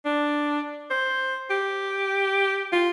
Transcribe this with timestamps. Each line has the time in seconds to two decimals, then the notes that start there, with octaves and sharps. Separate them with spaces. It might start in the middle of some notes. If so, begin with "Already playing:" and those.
0.05 D4
0.90 C5
1.50 G4
2.72 F4